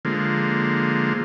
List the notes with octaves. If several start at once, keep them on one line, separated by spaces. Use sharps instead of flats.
D3 F3 G#3 A#3